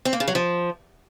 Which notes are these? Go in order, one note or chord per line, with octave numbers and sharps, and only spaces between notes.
C4
A#3
C#3
F#3
F3